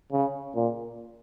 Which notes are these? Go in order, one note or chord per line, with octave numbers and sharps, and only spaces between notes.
C#3
A#2